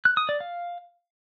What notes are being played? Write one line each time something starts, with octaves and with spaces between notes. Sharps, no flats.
F#6
D#6
D5
F5